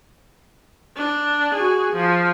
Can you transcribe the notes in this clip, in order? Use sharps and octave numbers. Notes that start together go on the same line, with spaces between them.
D4
F#4 G#4
F3